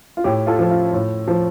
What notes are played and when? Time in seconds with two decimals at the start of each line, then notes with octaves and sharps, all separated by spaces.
0.17 F4
0.24 A2 G4
0.47 F4 A4
0.59 F3
0.70 F4
0.93 A2
1.28 F3